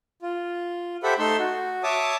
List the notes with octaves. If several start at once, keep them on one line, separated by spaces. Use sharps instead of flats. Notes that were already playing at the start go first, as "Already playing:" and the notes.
F4
G4 A4 C5 E5 F#5 B5
A3 D#4 A4 C6 E6
F#4
C#5 E5 A5 D6 D#6